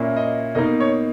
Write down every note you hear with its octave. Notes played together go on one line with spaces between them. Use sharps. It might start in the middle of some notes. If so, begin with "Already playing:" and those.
Already playing: A#2 A#3 C#4 E4
D#5
B2 A#3 D#4 D#5
C#5